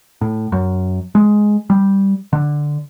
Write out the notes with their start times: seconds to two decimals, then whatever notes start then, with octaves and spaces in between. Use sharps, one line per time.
0.21 A2
0.52 F#2
1.15 G#3
1.70 G3
2.33 D3